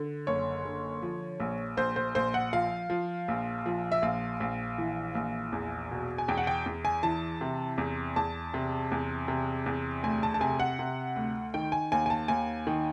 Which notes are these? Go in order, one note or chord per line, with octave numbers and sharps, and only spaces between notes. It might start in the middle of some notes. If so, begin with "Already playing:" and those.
Already playing: D3
F#1 C#5
D3
F3
A#1
A#1 C5
C5
A#1 C5
F#5
F3 F5
F3
A#1
F3
E5
A#1 F5
A#1
E3
A#1
E2
B2
G#5
E2 G5
F#5
G5
E2
G#5
E3 A5
C3
E2
E2 A5
C3
E2
C3
E2
D2 G#5
A5
A5
C3 G#5
F#5
C3
D2
D#3 G5
G#5
D#2 G#5
G#5
A5
D#2 G#5
D#3